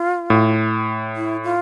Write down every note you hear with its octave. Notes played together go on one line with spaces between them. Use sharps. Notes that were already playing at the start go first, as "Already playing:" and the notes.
Already playing: F4
A2
E4
F4